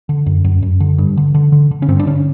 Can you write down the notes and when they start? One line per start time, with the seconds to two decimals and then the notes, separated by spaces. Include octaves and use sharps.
0.09 D3
0.26 F#2
0.45 F#2
0.62 F#2
0.80 D3
0.98 G2
1.17 D3
1.34 D3
1.52 D3
1.71 D3
1.82 C#4
1.88 G2 C4
1.99 D4
2.07 D3 C#4